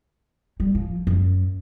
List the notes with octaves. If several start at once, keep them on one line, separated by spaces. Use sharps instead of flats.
G3
F3
F#2